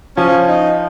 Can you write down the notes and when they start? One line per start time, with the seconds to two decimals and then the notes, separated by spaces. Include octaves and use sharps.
0.17 F3 C#4
0.48 D#4